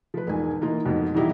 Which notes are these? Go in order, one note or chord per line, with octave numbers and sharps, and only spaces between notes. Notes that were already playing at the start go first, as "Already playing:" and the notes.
F3 B4
E1 G#2 G#5
E3 A#3 D#4 F4
F2 G#2 B2
B2 E3 G3 D#4 E4 G4